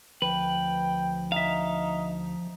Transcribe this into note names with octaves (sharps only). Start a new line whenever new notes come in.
D2 F3 B4 G5
D#4 E5 F5